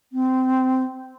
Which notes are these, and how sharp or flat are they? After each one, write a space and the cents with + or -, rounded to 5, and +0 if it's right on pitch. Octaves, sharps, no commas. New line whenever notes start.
C4 -15